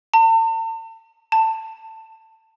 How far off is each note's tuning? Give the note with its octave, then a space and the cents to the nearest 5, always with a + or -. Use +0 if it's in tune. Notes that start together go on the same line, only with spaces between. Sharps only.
A5 +45
A5 +20